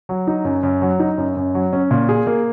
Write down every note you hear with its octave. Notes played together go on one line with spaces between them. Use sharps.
F#3
D#4
F#2
F#2
F#3
D#4
F#2
F#2
F#3
C#4
A#2
G#4
A#3